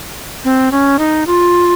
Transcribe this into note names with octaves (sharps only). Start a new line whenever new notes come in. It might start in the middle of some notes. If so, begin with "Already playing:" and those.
C4
C#4
D#4
F4